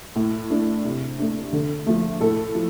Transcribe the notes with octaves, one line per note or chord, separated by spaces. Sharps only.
A2
A3 D4
C3
A3 D4
D3
F3 A3
A2 A4
F3